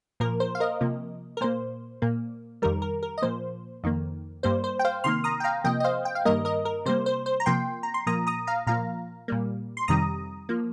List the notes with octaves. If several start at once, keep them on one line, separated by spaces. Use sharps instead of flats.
A#2 F3 A#3 A#4
C5
F5
A#4 D#5
C3 F3 A#3
A#4
A#2 A#3 C5
A#2 A#3
F2 D#3 G3 A#4
A#4
A#4
D#5
A#2 F3 A#3 C5
F2 D#3 A#3
G2 G3 A#3 C5
C5
G5
C5 F5
C3 D#3 A#3 C6 F6
A#5 D#6
G5
F5 A#5
C3 F3 A#3 D#5 G5
D#5
C5 F5
G5
F5
G2 D#3 G3 A#3 A#4 D#5
A#4 D#5
A#4
C3 G3 A#3 C5
C5
C5
A#5
C3 F3 A#3 G5 C6
A#5
C6
A#2 F3 A#3 A#5 D#6
A#5 D#6
F5 A#5
A#2 F3 A#3 F5 A#5
A#2 G3 A#3
C6
F2 C3 D#3 G3 A#5 D#6
F3 A#3